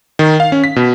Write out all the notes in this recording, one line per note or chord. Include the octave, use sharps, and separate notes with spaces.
D#3
F5
C#4
B6
B2